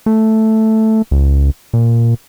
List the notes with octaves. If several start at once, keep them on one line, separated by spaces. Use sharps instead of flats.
A3
C#2
A#2